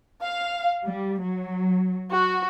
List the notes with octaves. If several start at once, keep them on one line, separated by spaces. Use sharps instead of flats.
F5
G3
F#3
F#4